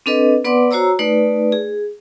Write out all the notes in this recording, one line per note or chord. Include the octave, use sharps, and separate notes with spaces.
C4 D4 A4 B4 D#5
B3 B4 D5 F#5 C6 D6
F#4 C5 C#5 A#5 E6
A3 D#4 B4 D5
G#4